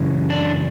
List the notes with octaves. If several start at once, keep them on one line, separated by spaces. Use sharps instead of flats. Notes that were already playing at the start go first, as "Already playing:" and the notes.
Already playing: F#2 C#3 E3
D4